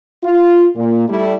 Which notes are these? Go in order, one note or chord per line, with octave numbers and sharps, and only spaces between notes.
F4
A#2
G3 A3 E4